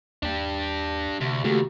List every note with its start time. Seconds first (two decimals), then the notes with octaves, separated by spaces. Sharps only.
0.23 D#2 D4 G4
1.21 D2 C3
1.44 D#2 C#3 A3 F#4 G4